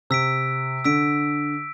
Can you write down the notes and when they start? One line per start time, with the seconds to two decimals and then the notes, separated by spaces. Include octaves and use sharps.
0.10 C3 E6 B6 D7
0.85 D3 E6 B6 D7